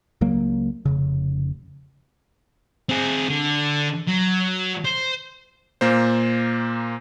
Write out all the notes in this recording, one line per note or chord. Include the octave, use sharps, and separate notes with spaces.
C#2 F#3 A#3
F1 C#3
C4 G#4
D3
F#3
C5
A#2 A#3 C5